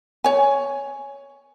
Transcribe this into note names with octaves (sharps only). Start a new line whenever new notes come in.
C#5 G#5